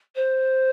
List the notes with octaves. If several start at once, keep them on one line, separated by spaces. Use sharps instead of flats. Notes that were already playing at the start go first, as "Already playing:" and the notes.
C5